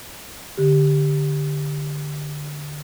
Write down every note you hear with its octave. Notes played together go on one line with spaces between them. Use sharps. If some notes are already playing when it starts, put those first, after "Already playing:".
D3 G4